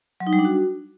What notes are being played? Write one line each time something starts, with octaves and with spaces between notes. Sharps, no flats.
F#3
D#4
G3
D4
F#4